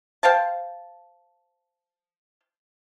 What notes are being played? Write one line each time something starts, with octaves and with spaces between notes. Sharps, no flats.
C5 F5 G5 A5